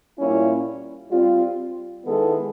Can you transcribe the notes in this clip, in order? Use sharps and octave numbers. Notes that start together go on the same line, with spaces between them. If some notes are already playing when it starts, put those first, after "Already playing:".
A#2 G3 A#3 C#4 E4
G3 C4 F4
D#3 G#3 B3 E4 A4